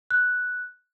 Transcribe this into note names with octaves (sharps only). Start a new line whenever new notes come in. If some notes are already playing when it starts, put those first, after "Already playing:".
F#6